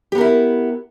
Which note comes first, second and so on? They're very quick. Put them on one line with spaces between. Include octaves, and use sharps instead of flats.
G4 B3 A#4 E4